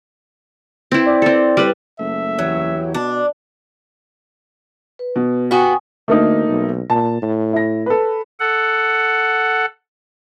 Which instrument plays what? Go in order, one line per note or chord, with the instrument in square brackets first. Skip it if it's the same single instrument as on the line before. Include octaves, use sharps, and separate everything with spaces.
[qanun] C4 E4
[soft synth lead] D5
[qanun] C4 A4
G3 B4
[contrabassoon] F#1 [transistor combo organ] A3 [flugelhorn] E5
[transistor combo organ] E2 E3 G4 [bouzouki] F#3
[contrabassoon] B2 [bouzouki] D4
[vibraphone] B4
[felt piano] B2
[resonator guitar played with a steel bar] B3 F#4 [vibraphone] G5 G#5 D#6
[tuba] D2 [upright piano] A3 A#3 D#4
[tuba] B1
[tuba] A#2 [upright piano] A5
[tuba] A2
[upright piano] E4 A#6
A4 B4
[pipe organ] A4 F#5